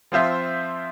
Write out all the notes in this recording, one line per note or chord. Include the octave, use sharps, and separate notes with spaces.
F3 C4 F4 C5 E5